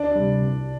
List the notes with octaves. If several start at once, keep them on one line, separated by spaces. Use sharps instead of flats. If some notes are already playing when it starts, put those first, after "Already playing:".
Already playing: D2 D4
C3 G3
C2